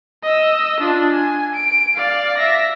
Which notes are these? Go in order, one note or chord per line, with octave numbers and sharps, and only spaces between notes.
D#5 E6
D4 F4
G#5
D7
D5 F5
E5 A#6